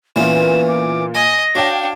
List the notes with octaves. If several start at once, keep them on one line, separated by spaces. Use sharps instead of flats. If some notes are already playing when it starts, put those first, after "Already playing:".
A#2 E3 B3 C#4 F4 E7
D6
D#5 G#5 A#6
D4 F#4 C#5 F5 G5